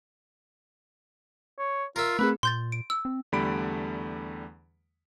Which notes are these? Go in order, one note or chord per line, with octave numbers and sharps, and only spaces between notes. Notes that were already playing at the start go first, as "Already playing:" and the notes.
C#5
F4 A#4 E5
A3 C4 G#4 B4
A#2 C6 G6 A6
D7
E6
C4
E2 D3 G3 A3 B5 D7